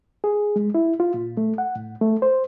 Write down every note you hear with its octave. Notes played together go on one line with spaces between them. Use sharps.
G#4
G#3
E4
F4
A#2
A3
F#5
A2
A3
C5